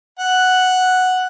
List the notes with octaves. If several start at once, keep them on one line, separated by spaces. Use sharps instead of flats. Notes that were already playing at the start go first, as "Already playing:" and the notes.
F#5